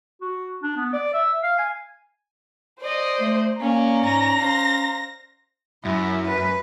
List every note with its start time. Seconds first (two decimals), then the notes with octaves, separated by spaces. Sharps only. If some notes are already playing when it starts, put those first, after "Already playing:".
0.21 F#4
0.63 D4
0.77 B3
0.93 D5
1.14 E5
1.43 F5
1.59 G#5
2.81 C5 D5 D#5
3.20 A3
3.61 A#3 C#4 D5 A#5
4.04 G#2 A#6
4.38 C#4 C5 F5
5.85 F#2 E4
6.28 B4